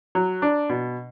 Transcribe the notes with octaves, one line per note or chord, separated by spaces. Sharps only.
F#3
D4
B2